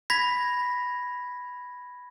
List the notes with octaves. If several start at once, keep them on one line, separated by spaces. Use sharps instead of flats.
B5 G#6 A#6 B6